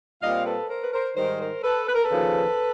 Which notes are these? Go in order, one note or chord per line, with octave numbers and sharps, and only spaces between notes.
A#2 G3 C4 D#5 F5
A4 B4
A#4 C5
B4
A#4 C5
G#2 D#3 G3 A#4 C5
A#4 C5
A4 B4
B4
A#4
A4 B4
D#2 C#3 F3